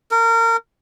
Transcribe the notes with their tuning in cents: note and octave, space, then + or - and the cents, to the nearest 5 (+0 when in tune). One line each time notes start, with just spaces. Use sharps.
A#4 -25